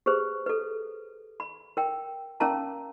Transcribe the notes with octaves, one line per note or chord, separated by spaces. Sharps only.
G4 G#4 B4 C5
A4 B4
B5
A#4 G5
C#4 A#4 F5 A5 A#5